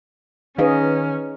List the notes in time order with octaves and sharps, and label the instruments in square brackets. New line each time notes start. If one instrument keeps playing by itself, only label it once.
[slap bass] D#3 [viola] C#4 [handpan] D#4 G#4 D#5 [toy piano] B4 F5